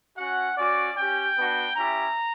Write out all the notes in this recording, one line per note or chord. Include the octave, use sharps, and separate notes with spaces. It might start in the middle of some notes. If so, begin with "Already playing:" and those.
C#4 F#4 F#5
C#4 F#4 D5
C#4 G4 G5
B3 D4 F#4
C#4 E4 G4 A#5